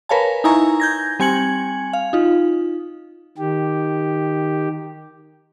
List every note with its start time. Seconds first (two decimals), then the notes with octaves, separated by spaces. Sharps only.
0.09 A#4 B4 C#5 F5 G#5 A5
0.44 D#4 E4 G#5 A#5 C#6
0.80 G6 G#6 A#6
1.20 G3 C4 G#5 G#6 C#7 F#7
1.93 F5
2.13 D#4 F4
3.38 D#3 G4